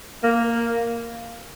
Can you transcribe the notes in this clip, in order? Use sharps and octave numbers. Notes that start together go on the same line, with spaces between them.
A#3